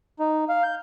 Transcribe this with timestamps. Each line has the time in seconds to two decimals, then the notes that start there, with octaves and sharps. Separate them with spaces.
0.19 D#4
0.49 F5
0.63 G6